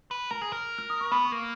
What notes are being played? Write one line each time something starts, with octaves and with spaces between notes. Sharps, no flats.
B4
A#4 A#5
G#4
A#4
F6
D#6
C#6
B3 B5
C#6
A#3